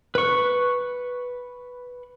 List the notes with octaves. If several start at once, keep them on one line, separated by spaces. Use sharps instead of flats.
B4 C#6